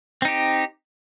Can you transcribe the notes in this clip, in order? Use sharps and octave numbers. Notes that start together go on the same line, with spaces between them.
C4 D#4 G4